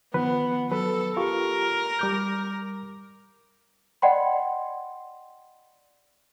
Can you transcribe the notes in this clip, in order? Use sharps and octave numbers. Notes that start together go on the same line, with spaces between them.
D#3 F3 B3 B4
F#3 A4 B4
F4 G4 A#4 C#6
G3 D6 G6
D5 D#5 F#5 G5 B5 C6